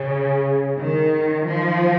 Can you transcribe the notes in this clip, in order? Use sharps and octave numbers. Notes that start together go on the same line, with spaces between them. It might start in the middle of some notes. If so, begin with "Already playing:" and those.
Already playing: C#3
D#3
F3